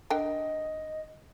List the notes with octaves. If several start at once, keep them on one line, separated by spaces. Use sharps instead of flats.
D3 A#4 D#5 G5